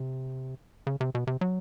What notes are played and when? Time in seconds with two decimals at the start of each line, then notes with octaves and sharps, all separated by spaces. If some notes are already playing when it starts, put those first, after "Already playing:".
Already playing: C3
0.87 C#3
1.01 C3
1.15 B2
1.27 C3
1.41 F#3